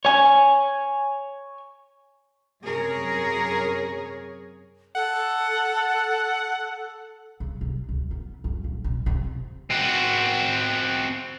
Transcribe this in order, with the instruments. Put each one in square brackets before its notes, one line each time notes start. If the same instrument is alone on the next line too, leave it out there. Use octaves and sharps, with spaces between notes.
[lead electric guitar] C#5 G#5
[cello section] F#2 C3 G#4 A#4 C#5
[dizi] A4 [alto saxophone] F#5
[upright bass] C#3
C3
D2
B3
F2
A#1
B2
C3
[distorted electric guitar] C4 F#4